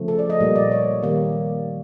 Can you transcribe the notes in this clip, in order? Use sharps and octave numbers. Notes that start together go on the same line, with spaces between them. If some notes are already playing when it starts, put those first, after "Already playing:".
Already playing: C#3 F3 A3
A4
D5
D#5
A#2 G3 A#3
D5
C#5
D#3 G3 A#3